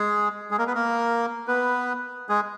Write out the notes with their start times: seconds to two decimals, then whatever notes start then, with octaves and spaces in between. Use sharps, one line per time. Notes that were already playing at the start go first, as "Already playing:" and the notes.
Already playing: G#3 G#4
0.51 G#3 G#4
0.58 A#3 A#4
0.67 B3 B4
0.75 A#3 A#4
1.47 B3 B4
2.29 G#3 G#4